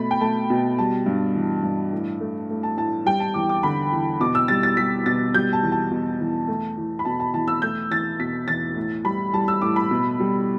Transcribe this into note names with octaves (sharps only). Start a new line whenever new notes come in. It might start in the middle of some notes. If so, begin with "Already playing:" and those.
Already playing: B2 A3 B5
G5
A3 A5
B2
G3 A5
G2
E3
G2
A2
A3
A3
A5
A2 A5
G3 G5
A5
E2 D6
D6
D3 B5
E2
B2 D6
E6
G3 A6
A6
G3 B6
B2 A6
G3 G6
A5
E2
A5
B2
E2
A3
E2
B5
B2 A5
A5
E2 A5
E6
A3 G6
E2 A6
B2 B6
E2 A6
A2
G3 B5
G3 A5
E6
A2 D6
B5
B2
G3